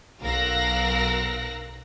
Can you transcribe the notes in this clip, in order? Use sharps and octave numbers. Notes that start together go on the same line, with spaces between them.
B1 A#4 F5 E6 F#6 A#6